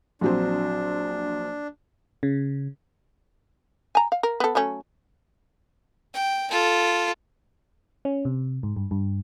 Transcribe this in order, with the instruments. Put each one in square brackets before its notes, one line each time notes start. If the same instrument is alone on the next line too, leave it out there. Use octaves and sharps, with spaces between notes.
[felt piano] A#1 F#3 C4 [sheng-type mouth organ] D4
[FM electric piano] C#3
[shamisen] G#5 A#5
F5
A#4
B3 A4
F#3 A3 C#4
[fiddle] G5
F4 A4
[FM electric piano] C#4
C3
G#2
G2
G2